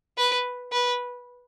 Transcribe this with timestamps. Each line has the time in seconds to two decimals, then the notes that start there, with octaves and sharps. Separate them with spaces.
0.17 B4
0.72 B4